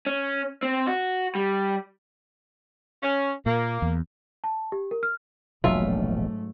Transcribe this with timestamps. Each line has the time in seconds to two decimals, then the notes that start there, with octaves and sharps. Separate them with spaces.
0.07 C#4
0.63 C4
0.87 F#4
1.35 G3
3.03 C#4
3.46 A#2 A#3
3.82 E2
4.44 A5
4.72 G4
4.91 A#4
5.03 F6
5.64 E1 A#1 G#2 B2 F#3 A3 F4 E5